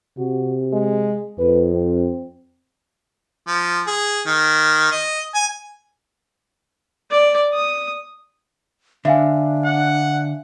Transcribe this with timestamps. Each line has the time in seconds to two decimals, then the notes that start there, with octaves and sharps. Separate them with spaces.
0.18 C3 F#4
0.73 G#3
1.39 F2 B4
1.73 C4
3.47 F3
3.87 G#4
4.27 D#3
4.92 D#5
5.35 G#5
7.11 D5
7.54 D#6
9.05 D3 D4 E5 F5 G#5
9.65 F#5